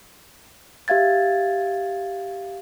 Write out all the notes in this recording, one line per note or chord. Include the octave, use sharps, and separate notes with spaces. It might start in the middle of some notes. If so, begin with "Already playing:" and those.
G4 E5 F5 G#6 A6